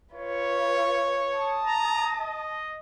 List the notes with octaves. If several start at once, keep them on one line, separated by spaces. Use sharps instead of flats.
F4 B4 C#5
A5 D#6
A#5
D#5